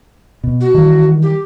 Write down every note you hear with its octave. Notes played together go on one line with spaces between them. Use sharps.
B2
F#4
D#3 E3 G3
G4